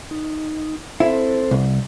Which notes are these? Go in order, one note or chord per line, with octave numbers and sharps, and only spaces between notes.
D#4
C4 E4 A4 C5
C2